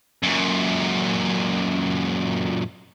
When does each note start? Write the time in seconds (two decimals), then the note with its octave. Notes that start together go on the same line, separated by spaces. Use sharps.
0.23 F#2 A#2